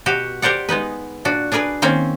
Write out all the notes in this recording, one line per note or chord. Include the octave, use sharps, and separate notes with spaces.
B2 F#4 G4
G4 A#4 C5 D5 F#5
G#3 B3 D#4 B4
A#2 D4 F#4
D4 G#4 A#4 B4 G#5
D#3 A#3 C4 C#4